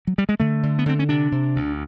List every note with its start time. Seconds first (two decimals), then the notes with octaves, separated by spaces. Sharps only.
0.07 F#3
0.18 G3
0.29 G#3
0.40 D3 A3
0.63 D3
0.79 B3
0.86 D3 C4
0.99 C#4
1.09 C3 D4
1.32 C3
1.56 D2